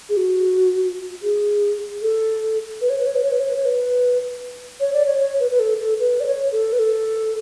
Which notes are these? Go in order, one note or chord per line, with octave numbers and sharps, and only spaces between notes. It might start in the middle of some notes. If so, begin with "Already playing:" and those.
G#4
F#4
G#4
A4
B4
C#5
B4
C#5
B4
C#5
B4
C#5
B4
C#5
B4
C#5
D5
C#5
C#5
B4
B4
A4
A4
B4
D5
C#5
A4
B4
A4